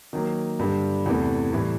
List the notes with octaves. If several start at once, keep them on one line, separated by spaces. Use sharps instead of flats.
D#3 F#3 A#3
G2 D3 G3
E2 C3 E3 A3
A2 E3 G3